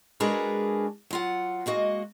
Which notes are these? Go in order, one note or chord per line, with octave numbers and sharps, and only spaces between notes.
G#3 D4 F#4 G#4 A#4 B4
F#3 F4 F#5
G#3 A#3 F#4 D#5